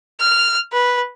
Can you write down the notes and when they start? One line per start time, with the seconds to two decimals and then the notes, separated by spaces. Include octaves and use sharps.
0.20 F6
0.73 B4